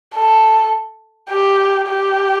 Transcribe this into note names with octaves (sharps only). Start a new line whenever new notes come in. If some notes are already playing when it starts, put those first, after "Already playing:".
A4
G4
G4